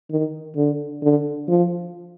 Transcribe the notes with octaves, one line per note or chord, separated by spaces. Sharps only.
D#3
D3
D3
F3